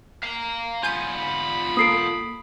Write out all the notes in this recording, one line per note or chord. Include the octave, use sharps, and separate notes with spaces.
F5 A#5
B3 F4 G#5 B5 G6 D#7
A#3 A4 D#6 C7 D7